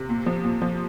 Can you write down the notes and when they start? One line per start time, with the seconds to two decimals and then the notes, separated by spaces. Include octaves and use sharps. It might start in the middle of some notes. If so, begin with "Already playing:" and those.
Already playing: C3
0.09 A#2
0.26 F3
0.44 A#2
0.62 F3